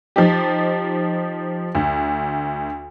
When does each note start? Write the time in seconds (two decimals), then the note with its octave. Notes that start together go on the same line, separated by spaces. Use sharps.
0.16 F3 D#4 G4
1.75 D2